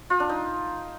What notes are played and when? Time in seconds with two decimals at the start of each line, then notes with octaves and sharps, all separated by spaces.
0.10 F4
0.20 D4
0.29 D#4